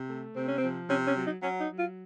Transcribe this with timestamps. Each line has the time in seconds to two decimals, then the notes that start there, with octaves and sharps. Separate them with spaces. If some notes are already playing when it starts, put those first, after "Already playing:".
Already playing: C3
0.09 A3
0.35 C3 C4
0.48 C#4
0.58 C4
0.63 F3
0.90 C3 C#4
1.07 C#4
1.16 F#3
1.25 D#4
1.43 F#3 C#4
1.61 D#4
1.70 F#3
1.79 F4